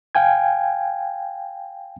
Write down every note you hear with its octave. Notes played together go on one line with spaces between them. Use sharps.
F5 G5 G#5 G#6